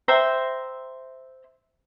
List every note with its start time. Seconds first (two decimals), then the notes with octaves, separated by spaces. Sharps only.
0.08 C5 E5 G5 A#5